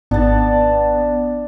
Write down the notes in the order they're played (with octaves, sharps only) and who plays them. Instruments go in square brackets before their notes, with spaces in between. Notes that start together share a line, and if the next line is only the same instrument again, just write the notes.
[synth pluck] G#1 [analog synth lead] B3 [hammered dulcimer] D4 A5